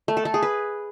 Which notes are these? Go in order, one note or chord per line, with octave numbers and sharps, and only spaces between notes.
A3
A4
A3
G#4
B4